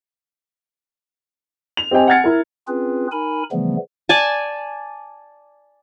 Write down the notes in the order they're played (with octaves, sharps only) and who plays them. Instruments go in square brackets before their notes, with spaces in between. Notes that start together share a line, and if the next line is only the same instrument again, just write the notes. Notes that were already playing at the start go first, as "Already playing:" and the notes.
[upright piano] F7
C4 G4 D#5 G5 G#5
F#5 G#5 F6 G#6 A6 C#7
E4 A#4
[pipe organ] C4 C#4 F4 G#4 B4
D#4 A#4 G#5 B5
C#3 E3 F3 G3 A3 B3
[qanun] D5 G#5 A5